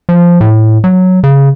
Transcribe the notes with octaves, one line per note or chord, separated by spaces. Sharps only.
F3
A2
F#3
C#3